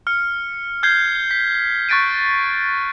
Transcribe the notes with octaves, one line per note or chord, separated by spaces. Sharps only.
F6 C#7
F6 G6 G#6 C7 G7
B6
C#6 F#6 A6 B6 D7 D#7